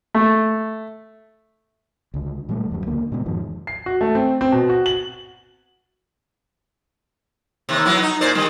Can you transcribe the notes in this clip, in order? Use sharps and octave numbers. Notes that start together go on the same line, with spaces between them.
A3
C#2 D3
A#2 E3 G3 A3
D#1 F#2 E3 G3
C#2 D3 A#3
A#2 C#3 G#3 B3
F2 G#2 D#3 F3
C7
F#4
A3
C4
C4
B2
F#4
F#7
D#2 C3
F#3 B3 E4
D#4
A#2 C5 D5
D#3 G3